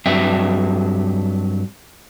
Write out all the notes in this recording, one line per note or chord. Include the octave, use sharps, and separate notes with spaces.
G2 F#3 C4 E5